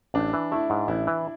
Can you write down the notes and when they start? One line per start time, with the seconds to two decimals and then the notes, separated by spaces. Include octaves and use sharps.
0.14 A1 D4
0.33 E3
0.52 A3 E4
0.70 G#2
0.88 A1 E4
1.07 E3